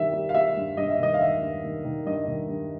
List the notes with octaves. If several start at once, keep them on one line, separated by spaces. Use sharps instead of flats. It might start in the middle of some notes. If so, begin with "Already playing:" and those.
Already playing: G2 D#3 G3 E5
G3
F5
G3 E5
G2
G2 D#5
E5
D#3 D#5
F5
D#3 E5
G2
D#3
D#3
G2 D#5
D#3
G2